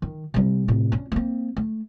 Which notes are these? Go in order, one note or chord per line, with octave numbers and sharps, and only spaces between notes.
D#3
C3 G3
A2 C3
C#4 D4
A#3 C4
A3